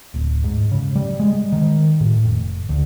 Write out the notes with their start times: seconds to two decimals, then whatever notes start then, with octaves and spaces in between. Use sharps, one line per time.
0.14 D1
0.44 G#2
0.71 C#3
0.96 G3
1.20 G#3
1.52 D#3
2.01 A2
2.24 F1
2.69 D2